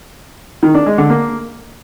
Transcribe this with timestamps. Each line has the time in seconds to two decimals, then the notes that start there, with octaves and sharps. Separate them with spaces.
0.63 D#3
0.74 D4
0.86 G#3
0.98 D3
1.10 A#3